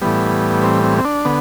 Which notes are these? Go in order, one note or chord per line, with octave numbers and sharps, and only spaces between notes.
A2 E3 G3 B3
C4
C4
C4
D4
D3 B3